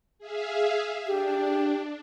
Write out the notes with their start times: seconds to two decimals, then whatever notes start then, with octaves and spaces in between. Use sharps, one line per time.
0.19 G#4 E5 F5
1.07 D4 G4